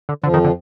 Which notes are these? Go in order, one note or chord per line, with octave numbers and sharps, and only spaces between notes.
D3
F2 D3 F3
D#3
D3